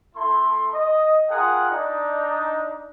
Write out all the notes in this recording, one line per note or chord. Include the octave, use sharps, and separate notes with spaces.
A3 E4 A4 C6
D#5
F4 G#4 A#4 F#5 G5 D#6
D4 D#4